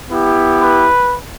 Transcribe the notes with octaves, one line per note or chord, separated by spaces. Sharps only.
B3 E4 G4
B4